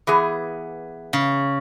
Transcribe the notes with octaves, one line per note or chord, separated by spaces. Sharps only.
E3 B3 G#4
C#3